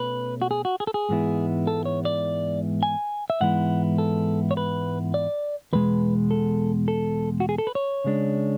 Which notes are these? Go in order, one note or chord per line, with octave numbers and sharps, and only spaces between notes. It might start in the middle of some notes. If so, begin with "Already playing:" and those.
Already playing: B2 A3 C#4 B4
F#4
G#4
F#4
G#4
A4
G#4
G#2 E3 G#3 B3 E4
A4
C#5
D5
G#5
E5
G#2 E3 G#3 B3 E4 F#5
A4
C#5
B4
D5
E2 B2 G#3 B4
A4
A4
F#4
G#4
A4
B4
C#5
C#3 G#3 D4